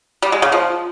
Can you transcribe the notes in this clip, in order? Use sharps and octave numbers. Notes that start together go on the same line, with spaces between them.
G3
G#3
C#3
F3